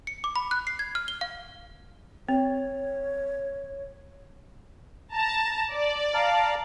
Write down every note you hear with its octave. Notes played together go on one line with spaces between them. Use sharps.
C#7
D6
B5
F#6
C7
G#6
F6
G7
F5
C4 C#5
A5 A#5
D5
F5 A5 A#5